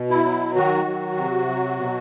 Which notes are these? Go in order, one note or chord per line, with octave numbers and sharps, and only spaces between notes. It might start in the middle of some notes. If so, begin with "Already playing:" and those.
Already playing: B2
E4
F#3
D#3 F#4
F#3
C3
F#3
B2